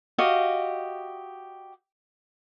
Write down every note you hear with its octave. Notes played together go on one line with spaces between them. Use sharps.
F#4 G4 D#5 F5